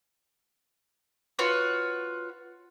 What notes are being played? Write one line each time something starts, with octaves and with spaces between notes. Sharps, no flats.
F4 F#4 B4 C#5